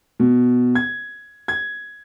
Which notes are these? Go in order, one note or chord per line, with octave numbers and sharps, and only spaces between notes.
B2
G#6
G#6